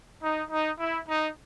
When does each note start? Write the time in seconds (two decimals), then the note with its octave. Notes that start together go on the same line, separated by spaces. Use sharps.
0.22 D#4
0.51 D#4
0.79 E4
1.08 D#4